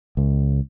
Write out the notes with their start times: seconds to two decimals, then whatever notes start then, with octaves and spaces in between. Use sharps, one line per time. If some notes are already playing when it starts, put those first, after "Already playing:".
0.17 C#2